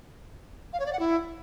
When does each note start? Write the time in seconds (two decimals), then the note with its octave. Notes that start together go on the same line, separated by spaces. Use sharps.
0.73 F5
0.80 C#5
0.86 D5
0.93 F#5
0.99 E4